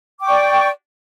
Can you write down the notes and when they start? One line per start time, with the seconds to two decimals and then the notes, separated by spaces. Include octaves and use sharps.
0.20 D6
0.22 G5
0.25 C#6
0.28 D5